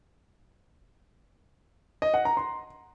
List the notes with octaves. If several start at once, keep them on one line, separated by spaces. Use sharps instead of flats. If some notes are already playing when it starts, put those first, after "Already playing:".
D#5
F#5
A#5
C6